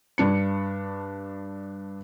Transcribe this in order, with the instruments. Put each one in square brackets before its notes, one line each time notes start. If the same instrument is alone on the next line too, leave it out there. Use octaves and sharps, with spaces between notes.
[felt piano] G2 D4 C#7